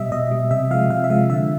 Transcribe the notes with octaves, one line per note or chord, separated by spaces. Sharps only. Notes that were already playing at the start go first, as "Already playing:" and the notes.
Already playing: B2 G3 D#5 E5
B2 D#5
G3
C3 E5
F3 G#3 F5
C3 F5
E5
F3 G#3 F5
D3 E5